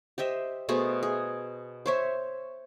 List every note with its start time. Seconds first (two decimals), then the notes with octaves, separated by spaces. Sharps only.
0.18 G4 C5 D#5 E5
0.69 B2 A3 G#4 C5
1.03 G#4
1.86 C5 C#5 E5